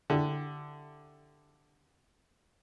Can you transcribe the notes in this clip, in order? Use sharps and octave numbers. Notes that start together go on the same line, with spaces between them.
D3 E4 G4